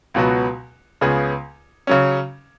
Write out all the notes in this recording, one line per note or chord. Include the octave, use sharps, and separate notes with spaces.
C#2 B2 F#3 B3 F#4
C#2 C#3 B3 G#4
C#3 F#3 C#4